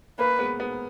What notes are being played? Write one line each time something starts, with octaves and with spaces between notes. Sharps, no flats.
A#3 B4
G#3 B3
G#3 B3